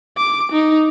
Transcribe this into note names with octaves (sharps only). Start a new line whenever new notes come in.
D6
D#4